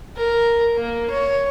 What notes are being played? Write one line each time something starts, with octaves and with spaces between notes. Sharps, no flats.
A#4
A#3
C#5